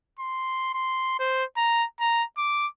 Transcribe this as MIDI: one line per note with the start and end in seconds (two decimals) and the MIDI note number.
0.19 0.73 84
0.74 1.16 84
1.19 1.44 72
1.57 1.85 82
2.01 2.24 82
2.37 2.67 86